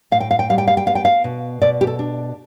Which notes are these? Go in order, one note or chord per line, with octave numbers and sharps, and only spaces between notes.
A2 F5
G5
F5
G5
G3 F5
G5
F5
G5
B3 F5
G5
F5
B2
B2 D5
G4
A4
D4